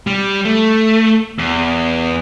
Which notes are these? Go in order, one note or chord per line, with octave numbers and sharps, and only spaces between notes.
G3
A3
E2